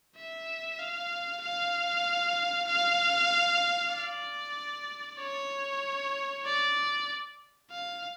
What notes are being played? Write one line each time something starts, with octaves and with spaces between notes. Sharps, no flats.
E5
F5
F5
F5
D5
C#5
D5
F5